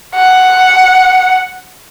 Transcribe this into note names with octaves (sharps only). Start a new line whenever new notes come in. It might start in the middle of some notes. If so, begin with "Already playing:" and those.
F#5